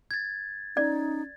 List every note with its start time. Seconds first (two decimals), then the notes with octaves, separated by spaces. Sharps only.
0.11 G#6 A6
0.77 C#4 D#4 D5